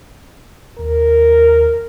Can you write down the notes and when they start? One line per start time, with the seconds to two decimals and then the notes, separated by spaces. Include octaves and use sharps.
0.79 D#2 A#4